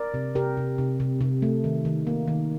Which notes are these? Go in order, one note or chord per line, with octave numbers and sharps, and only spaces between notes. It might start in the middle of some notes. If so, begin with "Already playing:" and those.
Already playing: A#4 D5
C3
C3 G4 A#4
C3
C3
C3
C3
A3
D#3
D#3
A#3
D#3